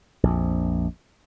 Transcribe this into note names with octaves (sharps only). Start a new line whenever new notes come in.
A#1 F2